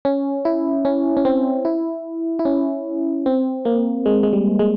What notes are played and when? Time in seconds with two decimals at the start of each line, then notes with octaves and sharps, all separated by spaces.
0.05 C#4
0.45 E4
0.85 C#4
1.17 C#4
1.25 C4
1.65 E4
2.39 E4
2.45 C#4
3.26 C4
3.65 A#3
4.06 G#3
4.23 G#3
4.33 G3
4.59 G#3